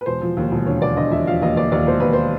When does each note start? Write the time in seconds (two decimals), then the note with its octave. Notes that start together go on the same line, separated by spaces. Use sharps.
0.01 B4
0.06 E1 C5
0.22 F3
0.37 D#2
0.52 E1
0.66 D3 C#5
0.82 D3 D5
0.96 D3 D#5
1.12 E1 E5
1.27 F3 F5
1.42 D#2 D#5
1.57 D#2 D5
1.72 D#2 D5
1.87 E1 C5
2.00 D#2 B4
2.13 C5